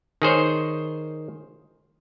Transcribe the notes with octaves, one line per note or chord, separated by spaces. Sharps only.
D#3 G#4 C5 C#5